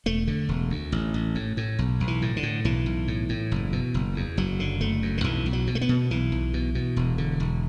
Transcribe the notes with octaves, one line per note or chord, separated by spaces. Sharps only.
E1 A3
D3
E1
D2
A1
A1
A2
A2
B1
B1
E3
A2
D3
A2
B1 E3
B1
A2
A2
F#1
B2
F#1
E2
F#1 F#3
D3
F#1 A3
F#2
D3
B1 E3
B1
F#3
B2
A3
B3
B2
B1 E3
B1
B2
B2
E1
D3
E1